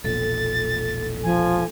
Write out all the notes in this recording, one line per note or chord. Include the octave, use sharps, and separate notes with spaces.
E1 A#1 A#2 A4 A6
F3 G#5